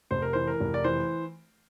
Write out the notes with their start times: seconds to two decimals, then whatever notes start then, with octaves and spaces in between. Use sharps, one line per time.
0.11 F1 C5
0.22 A#4
0.33 E3 C5
0.47 A#4
0.60 F1
0.74 D5
0.84 E3 C5